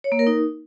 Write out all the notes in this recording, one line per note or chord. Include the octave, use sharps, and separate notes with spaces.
C#5
A#3
A#4
D#4